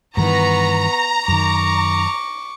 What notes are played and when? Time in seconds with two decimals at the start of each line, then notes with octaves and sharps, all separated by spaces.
0.17 G2 D#3 E3 B3 A#5 C#6
1.28 F#2 D#3 C#6 D6